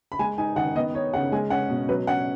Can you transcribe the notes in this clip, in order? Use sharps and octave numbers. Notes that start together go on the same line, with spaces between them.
B5
G#3 G#5
D#4 G#5
D#3 F#5
B3 D#5
D#4 C#5
C#3 F#5
G#3 G#5
C#4 F#5
B2
F#3 B4
C#4 F#5